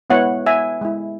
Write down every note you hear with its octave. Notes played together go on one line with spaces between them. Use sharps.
G#3 B3 E4 C#5 F#5
E5 G#5
G#3 E4